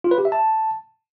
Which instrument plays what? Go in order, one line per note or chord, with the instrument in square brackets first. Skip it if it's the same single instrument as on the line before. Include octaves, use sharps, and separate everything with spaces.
[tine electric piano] F4
B4
G4
E5
A5